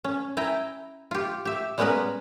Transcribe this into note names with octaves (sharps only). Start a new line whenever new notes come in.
C#4
E4 G5 G#5 A#5
F4 G4
G4 E5
G3 G#3 B3 C#4 A#4 B4